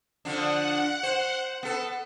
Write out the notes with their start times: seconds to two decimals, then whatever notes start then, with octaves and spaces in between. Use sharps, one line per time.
0.25 D3 F3 D4 F#5
1.03 C5
1.63 B3 A4